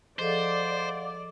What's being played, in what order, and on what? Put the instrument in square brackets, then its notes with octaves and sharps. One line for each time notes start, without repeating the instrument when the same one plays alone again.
[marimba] F3 G#4 A4 [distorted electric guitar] C5 [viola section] D5 [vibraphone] D#5 F5 F#5